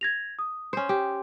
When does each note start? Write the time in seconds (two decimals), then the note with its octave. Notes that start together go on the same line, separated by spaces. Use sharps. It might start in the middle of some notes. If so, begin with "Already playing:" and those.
0.01 G#6 A#6 F7
0.39 D#6
0.73 C#4 C5
0.89 G4